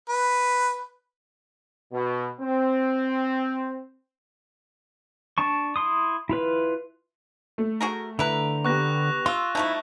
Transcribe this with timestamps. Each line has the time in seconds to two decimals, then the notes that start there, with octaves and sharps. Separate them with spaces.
0.09 B4
1.92 B2
2.41 C4
5.38 D4 A5 C#6
5.76 E4 C6 D#6
6.29 E4 F4 B4
7.58 A3
7.81 F#4 G#4 A#4
8.19 D3 E4 B4 A#5 F7
8.65 B3 G4 C#6 F#6 A#6
9.26 F4 C6 E6
9.55 F3 A3 D#4 E4 A5 C#6